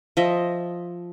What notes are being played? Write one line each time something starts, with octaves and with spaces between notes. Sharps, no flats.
F3 D#5 E5